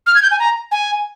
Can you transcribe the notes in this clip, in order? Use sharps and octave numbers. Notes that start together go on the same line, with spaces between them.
F6
G#6
G6
G#5
A#5
G#5